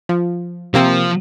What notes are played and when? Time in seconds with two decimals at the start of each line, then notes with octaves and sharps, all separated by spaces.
0.09 F3
0.74 C3 F3 A#3 C4